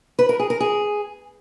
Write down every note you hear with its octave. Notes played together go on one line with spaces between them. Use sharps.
B4
A#4
G#4
A#4
G#4